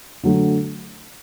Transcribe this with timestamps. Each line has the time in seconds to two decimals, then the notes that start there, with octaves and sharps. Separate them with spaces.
0.23 D3 F#3 A3